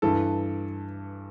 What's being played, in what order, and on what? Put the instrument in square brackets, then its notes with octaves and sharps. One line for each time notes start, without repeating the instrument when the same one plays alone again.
[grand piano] G2 E3 A4